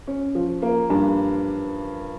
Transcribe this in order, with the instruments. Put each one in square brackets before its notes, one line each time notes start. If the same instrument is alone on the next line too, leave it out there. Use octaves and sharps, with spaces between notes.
[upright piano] C#4
F3
A#3
G2